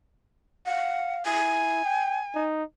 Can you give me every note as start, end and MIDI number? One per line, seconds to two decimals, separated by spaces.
0.67 1.24 77
0.67 1.15 78
1.25 1.83 64
1.25 2.44 80
1.85 2.21 79
2.35 2.64 63